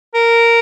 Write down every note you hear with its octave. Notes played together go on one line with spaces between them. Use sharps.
A#4